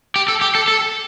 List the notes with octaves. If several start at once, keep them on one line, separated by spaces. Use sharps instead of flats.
G4
A4
G4
A4
A4